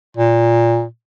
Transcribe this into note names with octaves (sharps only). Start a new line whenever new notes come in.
A#2